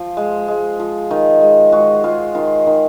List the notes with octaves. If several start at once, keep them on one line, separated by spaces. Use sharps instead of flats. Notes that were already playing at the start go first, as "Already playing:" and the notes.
Already playing: F3 C5
G#3
G#3
F3
D#3
G#3
G#3 F#4
G#3 F4
D#3 F4
D#3